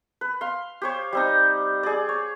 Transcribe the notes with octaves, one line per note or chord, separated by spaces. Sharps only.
B4
F5 C6
G4 C5 C#5
G3 C4 D#4
G#4 D5
C#5